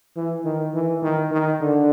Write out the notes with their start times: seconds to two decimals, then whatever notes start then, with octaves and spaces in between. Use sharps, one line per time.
0.16 E3
0.45 D#3
0.74 E3
1.02 D#3
1.32 D#3
1.61 D3